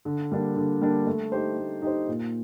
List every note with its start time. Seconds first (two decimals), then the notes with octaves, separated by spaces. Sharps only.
0.05 D3
0.31 G3 A#3 D4
0.56 D3
0.81 G3 A#3 D4
1.07 A3
1.32 D#4 G4 C5
1.57 A3
1.82 D#4 G4 C5
2.08 A#2